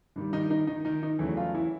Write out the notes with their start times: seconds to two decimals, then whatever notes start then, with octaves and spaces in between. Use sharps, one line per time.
0.16 G2 D#3 G3
0.33 D#3 D#4
0.50 D#3 D#4
0.67 D#3 D#4
0.85 D#3 D#4
1.02 D#3 D#4
1.19 E2 C#3 E3 F#3 A3 E4
1.37 F3 F4
1.54 E3 E4